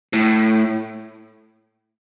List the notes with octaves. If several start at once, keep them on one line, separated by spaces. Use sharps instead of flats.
A2